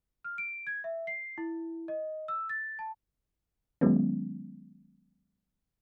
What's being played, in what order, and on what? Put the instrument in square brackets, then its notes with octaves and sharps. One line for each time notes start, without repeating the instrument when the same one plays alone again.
[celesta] F6
D7
G#6
E5
C7
E4
D#5
E6
A6
A5
[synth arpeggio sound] D#3 F#3 G#3 B3 C#4